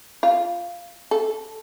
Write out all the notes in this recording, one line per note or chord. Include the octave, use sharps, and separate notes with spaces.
F4
A4